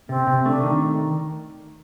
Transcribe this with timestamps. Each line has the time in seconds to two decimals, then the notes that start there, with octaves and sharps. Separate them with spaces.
0.09 C3 C4
0.27 C3
0.45 A3 D4
0.64 D#3